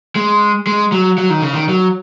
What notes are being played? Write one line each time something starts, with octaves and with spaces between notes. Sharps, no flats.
G#3
G#3
F#3
F#3
D#3
C#3
D#3
F#3